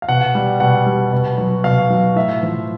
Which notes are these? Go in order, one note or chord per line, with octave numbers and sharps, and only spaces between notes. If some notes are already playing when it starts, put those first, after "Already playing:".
F5
B2 F#5
G3
B2 F#5
G3
B2
F#3
B2 F5
F#3
A2 E5
F3